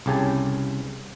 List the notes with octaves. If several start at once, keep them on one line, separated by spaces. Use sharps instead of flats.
C2 C#3 G4 G#5 A5